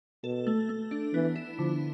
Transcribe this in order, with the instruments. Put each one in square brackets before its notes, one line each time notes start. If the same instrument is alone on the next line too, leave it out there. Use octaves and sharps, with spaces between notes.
[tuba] B2 [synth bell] A4
[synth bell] A3
A3
D4
[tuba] E3 [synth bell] B3
[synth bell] E4
[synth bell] D3 [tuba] F3